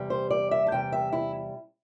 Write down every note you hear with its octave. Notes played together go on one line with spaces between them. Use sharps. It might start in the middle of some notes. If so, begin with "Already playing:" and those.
Already playing: E2 C3 G3
C5
D5
E5
A5
E2 C3 G3 G5
E5
E4